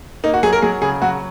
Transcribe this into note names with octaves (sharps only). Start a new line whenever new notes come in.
A#3 D#4
F#4
F#3 G#4
A#4
F#3 G#4
C#3 G#4
F#3 F#4